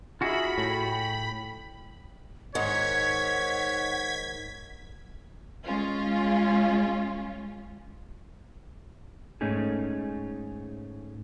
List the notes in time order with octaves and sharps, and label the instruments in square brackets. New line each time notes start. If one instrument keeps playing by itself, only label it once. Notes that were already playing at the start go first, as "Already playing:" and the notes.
[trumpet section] D#4 D#5 E5 [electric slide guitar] F4 F#4 G#4 [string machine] B5
[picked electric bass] A2 [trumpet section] G5
[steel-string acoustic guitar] G#2 D#3 [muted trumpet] C#5 [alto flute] F#5 [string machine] G#6 B6
[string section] G#3 C#4 F4
[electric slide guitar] G#2 A3 C#4 D#4 G#4